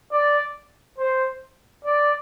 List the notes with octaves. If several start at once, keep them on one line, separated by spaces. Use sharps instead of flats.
D5
C5
D5